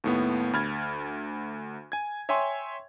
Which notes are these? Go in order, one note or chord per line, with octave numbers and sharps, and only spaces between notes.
D#2 A2 B3
D2 B5 F6 G#6 A6
G#5 G#6
C#5 E5 G5 G#5 C6 C#6